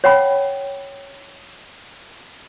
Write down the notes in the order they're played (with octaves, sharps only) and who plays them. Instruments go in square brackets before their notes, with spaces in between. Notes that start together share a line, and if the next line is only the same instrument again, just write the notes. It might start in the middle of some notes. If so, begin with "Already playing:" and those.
[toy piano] C#5 F#5 G5 B5